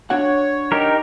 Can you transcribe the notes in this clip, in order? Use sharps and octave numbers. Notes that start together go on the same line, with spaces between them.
D4 F#4 C#5 F#5
D#4 G4 A#4